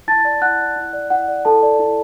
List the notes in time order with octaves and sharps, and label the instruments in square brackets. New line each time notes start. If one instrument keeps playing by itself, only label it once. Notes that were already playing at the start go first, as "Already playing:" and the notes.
[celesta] E4 A5 A6
D5
E4 F#5 F#6
D5
E4
D5
E4 F#5
D5
E4 A4 A5
D5
E4